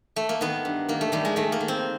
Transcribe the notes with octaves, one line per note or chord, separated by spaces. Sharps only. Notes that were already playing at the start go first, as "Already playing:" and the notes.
A3
A#3
D#3 B3
G2
D#3 A#3
A3
D#3 G3
G#3
D#3 A3
A#3
D#3
C4